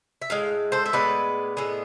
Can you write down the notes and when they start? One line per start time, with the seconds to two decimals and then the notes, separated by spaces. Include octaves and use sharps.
0.22 E5
0.30 A2 G#3 F5
0.72 A4 C5
0.86 E5
0.93 A2 G#3 B3 B4 D5
1.57 A2 G#3 B3